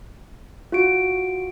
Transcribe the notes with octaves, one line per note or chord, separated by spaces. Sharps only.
F4 F#4 D7